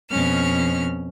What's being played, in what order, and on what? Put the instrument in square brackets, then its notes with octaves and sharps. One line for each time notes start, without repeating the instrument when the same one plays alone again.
[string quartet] F2 B2 C#4 F6